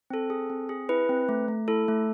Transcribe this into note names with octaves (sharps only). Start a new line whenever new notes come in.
C4 A4
G#4
C4
G#4
E4 B4
C4
A3
A3
E4 A4
A3